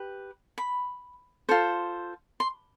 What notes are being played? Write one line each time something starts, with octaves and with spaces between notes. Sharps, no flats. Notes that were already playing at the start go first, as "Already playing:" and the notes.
Already playing: G4 B4
B5
F4 A4 C5
C6